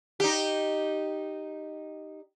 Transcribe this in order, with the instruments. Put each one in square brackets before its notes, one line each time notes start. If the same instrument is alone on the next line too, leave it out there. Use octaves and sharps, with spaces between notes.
[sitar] D#4 G4